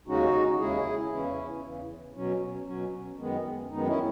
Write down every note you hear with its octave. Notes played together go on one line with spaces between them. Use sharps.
D#2 C#3 G#3 C#4 D#4 F#4
D#2 C#3 G#3 C#4 E4 G#4
E2 C#3 E3 C#4 E4
E2 C#3 E3
B2 F#3 C#4
B2 F#3 C#4
F#2 D#3 G#3 B3
F#2 D#3 G#3 B3 D#4
C#4 E4